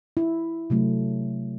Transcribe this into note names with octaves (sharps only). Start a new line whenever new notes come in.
E4
C3 F#3 A3